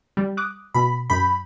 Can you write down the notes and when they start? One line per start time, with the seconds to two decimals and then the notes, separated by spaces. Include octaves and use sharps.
0.17 G3
0.37 D6 D#6 F#6
0.74 B2 B5
1.10 F#2 B5 G6